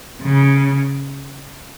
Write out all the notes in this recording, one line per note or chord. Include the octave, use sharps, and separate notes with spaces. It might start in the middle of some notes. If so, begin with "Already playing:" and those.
C#3